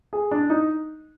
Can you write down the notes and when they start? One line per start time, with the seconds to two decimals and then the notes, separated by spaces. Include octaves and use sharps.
0.13 G#4
0.31 D4
0.50 D#4